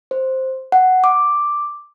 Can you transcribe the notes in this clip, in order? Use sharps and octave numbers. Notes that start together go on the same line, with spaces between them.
C5
F#5
D6